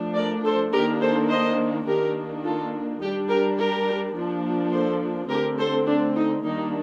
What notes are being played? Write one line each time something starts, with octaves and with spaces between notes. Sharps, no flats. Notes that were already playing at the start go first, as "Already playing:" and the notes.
Already playing: F3 A3 D4
A#4 D5
A4 C5
D#3 A#3 D4 G4 A#4
A4 C5
C5 D#5
D#3 A#3 D4 G4 A#4
F4 A4
G3 D4 D#4 G4
G4 A#4
G4 A#4
F3 A#3 D4
A4 C5
D3 A3 C4 G4 A#4
A4 C5
D4
D#4
D#3 G3 A#3 D4 D#4